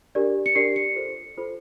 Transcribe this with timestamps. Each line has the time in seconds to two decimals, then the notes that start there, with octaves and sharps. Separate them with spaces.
0.15 D4 G4 A#4 D5
0.46 C#7
0.55 D4 G4 A#4 D5 C7
0.76 C#7
0.96 F4 A4 C5
1.37 F4 A4 C5